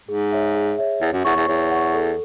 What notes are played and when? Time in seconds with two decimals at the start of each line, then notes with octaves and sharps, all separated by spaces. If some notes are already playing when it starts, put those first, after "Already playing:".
0.09 G#2 G#4
0.32 C#5 E5
0.55 G#4
0.78 C#5 E5
1.01 E2 C#5
1.13 F#2
1.25 E2 F#5 C#6
1.36 E2
1.48 E2 C#5
1.71 F#5 C#6
1.94 A4